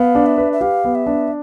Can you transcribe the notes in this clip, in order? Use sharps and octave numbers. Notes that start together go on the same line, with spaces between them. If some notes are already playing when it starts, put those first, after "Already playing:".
Already playing: B3 F5
D4
E5
B4
E5
G4 F5
B3
E5
D4